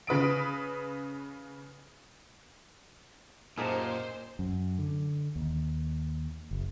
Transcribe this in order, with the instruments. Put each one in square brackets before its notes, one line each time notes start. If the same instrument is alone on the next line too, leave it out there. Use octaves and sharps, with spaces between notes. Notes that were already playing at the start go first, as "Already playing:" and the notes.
[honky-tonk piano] C#3 B4 D#6 D7
[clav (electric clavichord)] F#2 G4 A5 [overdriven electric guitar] A#2 [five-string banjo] D#4 G#4 A#4 [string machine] C5
[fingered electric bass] F#2
D3
D#2
F#1